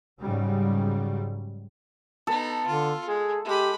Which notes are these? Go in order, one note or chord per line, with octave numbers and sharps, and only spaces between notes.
G#2 C#3 F#3 G3
B3 D#4 A4
D3 F4
G#3 G#4
G#3 G4 B5